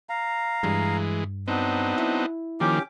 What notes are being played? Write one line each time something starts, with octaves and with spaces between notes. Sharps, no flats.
F5 A#5
G2 E3 G#3
F#3 B3 C4 D4 D#4
E4
D#3 F3 A#3 C#4 G4 D6